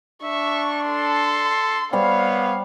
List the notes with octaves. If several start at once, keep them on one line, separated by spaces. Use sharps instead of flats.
D4 E5 C#6
A4 C6
G3 B3 C5 C#5 F5